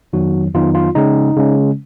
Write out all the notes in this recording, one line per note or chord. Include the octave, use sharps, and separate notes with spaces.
F2 D#3 F#3 B3 D#4 F#4
F2 D#3 F#3 B3 D#4 F4
F4
C#3 G#3 C#4 D#4
C#3 G#3 C#4